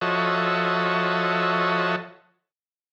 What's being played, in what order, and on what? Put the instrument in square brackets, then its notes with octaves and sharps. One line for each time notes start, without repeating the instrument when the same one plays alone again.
[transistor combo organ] F3 F#4 A4 C#5 D#5 E5